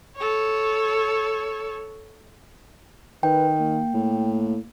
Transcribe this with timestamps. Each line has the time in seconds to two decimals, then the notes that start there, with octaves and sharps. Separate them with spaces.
0.16 A4 C#5
3.23 D#3 B4 G5
3.59 A#3
3.94 A2